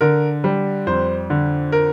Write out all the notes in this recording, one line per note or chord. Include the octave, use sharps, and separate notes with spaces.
D3 A#4
G3
F2 C5
D3
A#4